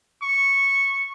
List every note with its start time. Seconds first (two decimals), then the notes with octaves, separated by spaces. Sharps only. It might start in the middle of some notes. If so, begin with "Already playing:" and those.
0.22 C#6